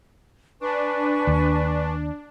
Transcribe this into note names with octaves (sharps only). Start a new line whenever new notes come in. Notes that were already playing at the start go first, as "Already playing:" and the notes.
D4 B4 G#5 C#6
D#2